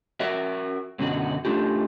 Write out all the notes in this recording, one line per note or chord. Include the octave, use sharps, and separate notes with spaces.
F#4 A#4 E5
F#2 B2 D3 F#4
A3 D4 F4 G4